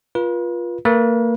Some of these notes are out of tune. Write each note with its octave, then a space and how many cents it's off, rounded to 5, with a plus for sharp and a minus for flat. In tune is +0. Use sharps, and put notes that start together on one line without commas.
F4 +0 B4 -40
A#3 -30 B4 -40